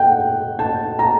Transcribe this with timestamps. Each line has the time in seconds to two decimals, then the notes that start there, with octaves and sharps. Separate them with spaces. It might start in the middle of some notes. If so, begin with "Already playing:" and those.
Already playing: F#5 G5
0.59 A5
0.99 A#5